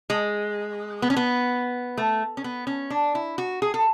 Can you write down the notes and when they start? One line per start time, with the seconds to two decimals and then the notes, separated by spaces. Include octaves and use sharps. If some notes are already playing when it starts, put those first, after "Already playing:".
0.10 G#3
1.02 B3
1.10 C#4
1.17 B3
1.98 A3
2.37 C#4
2.44 B3
2.67 C#4
2.90 D4
3.15 E4
3.38 F#4
3.62 G#4
3.74 A4